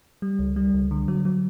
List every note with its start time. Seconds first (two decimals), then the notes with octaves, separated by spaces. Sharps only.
0.22 G3
0.39 C#2
0.56 G3
0.74 C#2
0.91 D3
1.08 F#3
1.25 F#3